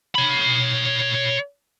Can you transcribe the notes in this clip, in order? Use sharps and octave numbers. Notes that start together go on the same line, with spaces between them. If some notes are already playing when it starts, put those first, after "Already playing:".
C#5 B5